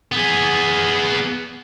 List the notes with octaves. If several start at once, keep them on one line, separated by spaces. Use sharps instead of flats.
B3 G#4